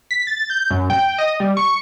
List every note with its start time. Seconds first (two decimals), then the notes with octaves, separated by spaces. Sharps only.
0.11 B6
0.27 A6
0.50 G6
0.70 F#2
0.90 G5
1.18 D#5
1.40 G3
1.57 C#6